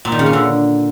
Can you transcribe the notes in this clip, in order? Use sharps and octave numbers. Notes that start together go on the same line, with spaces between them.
A#2
D#3
C#3
C#4
D3